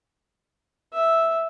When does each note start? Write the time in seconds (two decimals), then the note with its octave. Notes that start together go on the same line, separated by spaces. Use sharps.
0.93 E5